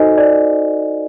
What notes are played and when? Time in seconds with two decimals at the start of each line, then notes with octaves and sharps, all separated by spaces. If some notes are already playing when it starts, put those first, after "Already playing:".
Already playing: D#4 F#4 A4 C5 D#5 G#5
0.18 D5